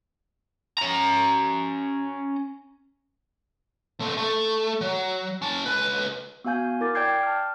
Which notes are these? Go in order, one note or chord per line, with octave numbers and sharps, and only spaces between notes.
C#4 A#5
A3 C4
A3
F#3
C#4 A5
C#2 B4
B3 F#4 F5 G#5 G6
E4 A#4 D6 A6
D5 G5 D6 G6 G#6 C7
A5 F6